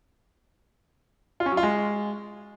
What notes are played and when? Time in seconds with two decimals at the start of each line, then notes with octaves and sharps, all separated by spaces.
1.40 F4
1.46 C#4
1.52 F#3
1.57 F4
1.63 G#3